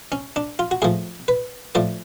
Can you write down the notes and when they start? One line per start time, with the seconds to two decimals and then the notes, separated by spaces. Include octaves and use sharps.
0.12 C#4
0.36 D4
0.59 F4
0.71 F#4
0.82 A2 F3 G#4
1.28 B4
1.75 A2 F3 D5